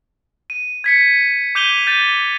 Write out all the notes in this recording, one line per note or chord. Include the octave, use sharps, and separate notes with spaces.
D#7
G#6 B6 C#7
D6 G6 D#7 F7 G7
G6 A6 D#7